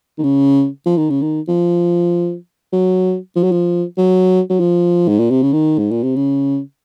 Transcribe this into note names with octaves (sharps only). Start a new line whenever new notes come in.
D#3
C#3
F3
D#3
C#3
D#3
F3
F#3
F3
F#3
F3
F#3
F#3
F3
G#2
A#2
C3
C#3
D#3
G#2
A#2
C3
C#3